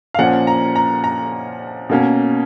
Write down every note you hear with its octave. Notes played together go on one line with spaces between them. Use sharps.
F5
A#2 F3 A#3 C#4 F#5
A#5
A#5
A#5
B2 A#3 C#4